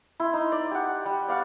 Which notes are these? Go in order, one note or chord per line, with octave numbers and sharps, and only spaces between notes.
E4 C6
D#4
D5
G4 F#5
G3
D5 F5 F#5 C#6